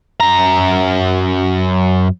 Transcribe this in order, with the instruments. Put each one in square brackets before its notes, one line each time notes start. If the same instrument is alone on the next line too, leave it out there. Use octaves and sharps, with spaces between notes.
[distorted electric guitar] F#2 A#5